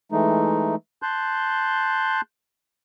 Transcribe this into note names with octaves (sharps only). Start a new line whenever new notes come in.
E3 G#3 A3 D#4
A5 C6 F#6 G6